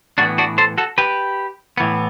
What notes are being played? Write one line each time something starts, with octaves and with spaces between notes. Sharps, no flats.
A2 E3 B3 D4 F#4
D4 F#4
A4 C5
F#4 A4
G4 B4
A2 E3 B3